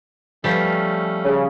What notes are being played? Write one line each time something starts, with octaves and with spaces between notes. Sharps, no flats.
F3 G3 A3 C#4 A4
C#3